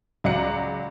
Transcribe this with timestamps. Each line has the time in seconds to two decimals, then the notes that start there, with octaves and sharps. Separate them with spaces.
0.24 C#2 F#3 D5 A#5 F#6 C#7